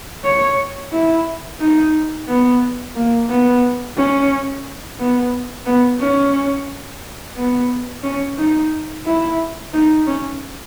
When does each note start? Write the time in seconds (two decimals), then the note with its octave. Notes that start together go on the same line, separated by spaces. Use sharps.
0.25 C#5
0.92 E4
1.60 D#4
2.28 B3
2.96 A#3
3.29 B3
3.97 C#4
4.99 B3
5.66 B3
6.00 C#4
7.36 B3
8.03 C#4
8.38 D#4
9.06 E4
9.74 D#4
10.07 C#4